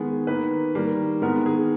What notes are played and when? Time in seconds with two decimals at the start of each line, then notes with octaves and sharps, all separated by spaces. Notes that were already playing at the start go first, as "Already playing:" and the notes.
Already playing: D#3 G#3 B3 G#4
0.27 D#3 A#3 B4
0.75 D#3 G3 A#3
1.22 D#3 G#3 B3 A#4
1.46 G#4